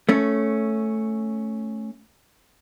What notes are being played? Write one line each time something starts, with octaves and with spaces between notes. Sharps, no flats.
A3 C#4